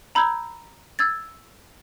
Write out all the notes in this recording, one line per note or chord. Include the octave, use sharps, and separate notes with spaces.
A#5 B5 E6 G6 G#6
E6 G#6 A6